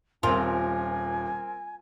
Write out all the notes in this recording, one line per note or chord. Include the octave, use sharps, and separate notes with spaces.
D#1 C4 F4 A#4 G#5